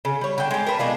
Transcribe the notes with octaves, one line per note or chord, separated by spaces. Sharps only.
C#3
G3 C#5
D3 G5
G#3 G4
A#4 B4 A5
B2 G#3 D4 F4